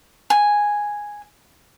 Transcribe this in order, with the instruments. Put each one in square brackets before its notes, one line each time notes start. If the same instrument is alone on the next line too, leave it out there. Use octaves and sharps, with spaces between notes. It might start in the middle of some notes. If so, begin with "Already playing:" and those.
[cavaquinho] G#5